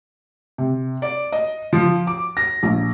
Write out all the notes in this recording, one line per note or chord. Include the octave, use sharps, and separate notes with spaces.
C3
D5
D#5
F3
D6
A#6
A#1